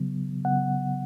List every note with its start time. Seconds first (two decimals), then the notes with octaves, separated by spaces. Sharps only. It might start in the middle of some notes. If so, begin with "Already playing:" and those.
Already playing: C#3 F#3 B3
0.44 C#3 F#3 B3 F#5